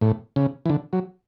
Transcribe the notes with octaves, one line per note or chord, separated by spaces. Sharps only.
A2
C#3
E3
D3
F#3